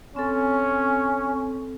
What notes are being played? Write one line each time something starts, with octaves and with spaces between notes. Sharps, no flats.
C4 C#4 A4